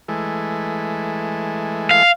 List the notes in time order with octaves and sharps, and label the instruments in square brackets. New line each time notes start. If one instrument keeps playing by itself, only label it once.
[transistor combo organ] E3 G#3 A3
[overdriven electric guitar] F5